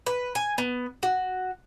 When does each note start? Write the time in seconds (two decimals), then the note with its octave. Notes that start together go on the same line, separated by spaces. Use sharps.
0.06 B4
0.35 G#5
0.58 B3
1.03 F#4